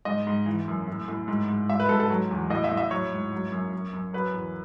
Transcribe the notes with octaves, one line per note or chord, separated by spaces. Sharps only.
G#2 D#5
G#2
E3
F#2
A2
A2
G#2
G#2
G#2 E5
B4
G#2 A4
A4
F#3
E2
A2 D#5
E5
A2
E5
F#3 C#5
G#2
F#3
F#2
F#2
F#2
F#3 B4
E2